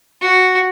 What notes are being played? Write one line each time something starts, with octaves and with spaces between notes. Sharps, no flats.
F#4